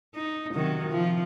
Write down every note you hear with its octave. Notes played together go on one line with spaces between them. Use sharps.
D#4
C3 D#3 F#3
F3